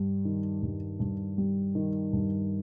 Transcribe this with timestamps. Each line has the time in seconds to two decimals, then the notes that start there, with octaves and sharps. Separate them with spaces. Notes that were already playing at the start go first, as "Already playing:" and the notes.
Already playing: G2 G3
0.25 D#3
0.62 G2
1.00 G2
1.38 G3
1.75 D#3
2.13 G2